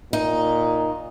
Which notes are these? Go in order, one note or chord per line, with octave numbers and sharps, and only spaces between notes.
A#2 D#4